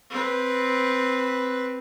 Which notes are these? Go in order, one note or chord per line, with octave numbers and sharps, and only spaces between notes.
C4 B4